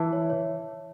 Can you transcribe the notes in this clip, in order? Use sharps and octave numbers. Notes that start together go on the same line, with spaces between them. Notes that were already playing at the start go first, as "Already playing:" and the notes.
Already playing: E3 E5 A5
C#5
C#5